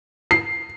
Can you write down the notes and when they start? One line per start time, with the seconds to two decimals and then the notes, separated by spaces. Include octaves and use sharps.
0.31 C7